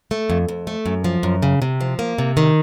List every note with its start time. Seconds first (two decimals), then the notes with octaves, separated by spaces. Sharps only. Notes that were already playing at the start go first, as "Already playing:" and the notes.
0.11 A3
0.30 F2
0.48 F2
0.67 A3
0.86 F#2
1.04 F3
1.23 F#2
1.43 C#3
1.62 C3
1.81 F3
1.99 A#3
2.18 C3
2.37 D#3